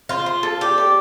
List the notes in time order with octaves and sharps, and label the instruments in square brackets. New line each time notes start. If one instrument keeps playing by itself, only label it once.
[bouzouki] F4 [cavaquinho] C5
[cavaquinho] C5
A4
[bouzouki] G4 [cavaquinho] D5
[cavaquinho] D5